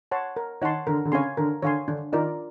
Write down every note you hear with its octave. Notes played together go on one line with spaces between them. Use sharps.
C#5 F#5 A5 C6
A#4
D#3 C#5 F#5 A5 C6
D3 A#4
D3
C#3 C#5 F5 G#5 C6
D3 A#4
D3 C#5 F5 G#5 C6
D3 D4
D#3 F4 A#4 D5